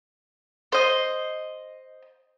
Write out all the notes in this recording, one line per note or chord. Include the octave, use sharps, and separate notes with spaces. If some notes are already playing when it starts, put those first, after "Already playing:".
C5 D#5